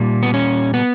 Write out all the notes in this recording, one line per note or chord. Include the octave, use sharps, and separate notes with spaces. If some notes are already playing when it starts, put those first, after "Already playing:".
Already playing: A#2 G3
B3
C#4
B3